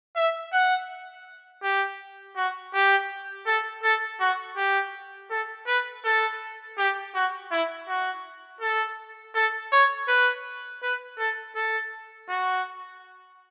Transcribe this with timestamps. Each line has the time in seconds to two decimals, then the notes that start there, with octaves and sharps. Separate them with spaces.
0.16 E5
0.53 F#5
1.63 G4
2.36 F#4
2.74 G4
3.47 A4
3.83 A4
4.20 F#4
4.57 G4
5.30 A4
5.67 B4
6.04 A4
6.78 G4
7.15 F#4
7.51 E4
7.88 F#4
8.61 A4
9.35 A4
9.72 C#5
10.08 B4
10.83 B4
11.18 A4
11.56 A4
12.29 F#4